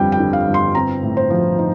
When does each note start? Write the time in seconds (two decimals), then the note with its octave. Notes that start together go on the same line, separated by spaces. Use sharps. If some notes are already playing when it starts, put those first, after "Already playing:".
Already playing: G1 F2 D3 G3 G5
0.12 G5
0.19 D3
0.33 F5
0.48 G1
0.54 C6
0.75 C4 A#5
1.03 A2
1.17 C5
1.30 F3
1.59 D#4